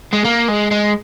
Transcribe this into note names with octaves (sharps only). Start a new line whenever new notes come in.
G#3
A#3
G#3
G#3